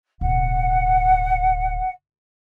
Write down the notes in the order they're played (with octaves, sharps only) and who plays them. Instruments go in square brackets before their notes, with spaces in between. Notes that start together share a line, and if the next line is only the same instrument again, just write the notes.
[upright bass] D1 B2 [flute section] F#5